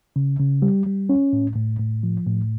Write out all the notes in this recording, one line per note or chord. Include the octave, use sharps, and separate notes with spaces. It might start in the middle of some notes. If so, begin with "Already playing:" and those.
C#3
C#3
G3
G3
C#4
A2
A2
A2
F3
A2